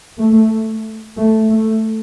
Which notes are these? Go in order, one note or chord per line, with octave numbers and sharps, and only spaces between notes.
A3
A3
A3